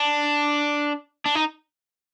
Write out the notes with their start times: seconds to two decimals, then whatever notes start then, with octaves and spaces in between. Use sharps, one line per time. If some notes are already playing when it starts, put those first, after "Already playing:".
Already playing: D4
1.26 D4
1.35 D#4